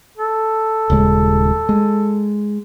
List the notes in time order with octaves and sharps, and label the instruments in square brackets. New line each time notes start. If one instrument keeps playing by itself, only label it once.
[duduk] A4
[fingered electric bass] D#1 C#3 G#3
G#3